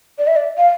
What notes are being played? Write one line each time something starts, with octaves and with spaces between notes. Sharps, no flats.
D5
E5
D5
F5